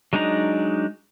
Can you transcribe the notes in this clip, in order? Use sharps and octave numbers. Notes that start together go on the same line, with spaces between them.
F#3 G#3 D4 D#4 A#5